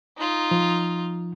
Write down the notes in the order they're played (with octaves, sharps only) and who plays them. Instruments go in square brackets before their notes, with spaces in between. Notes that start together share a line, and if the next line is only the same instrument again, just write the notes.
[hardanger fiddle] D#4 F4
[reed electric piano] F3